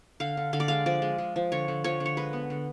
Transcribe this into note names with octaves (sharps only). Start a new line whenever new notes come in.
D3 F5
D3
D3 F5
D5
G#3 F5
F3 D5
G#3
G#3
F3
D3 C#5
D3
F3 C#5
D3
C#5
G#3 B4
B3
D3